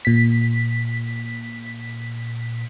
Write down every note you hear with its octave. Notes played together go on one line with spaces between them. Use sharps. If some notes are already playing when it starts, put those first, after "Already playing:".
A#2 B6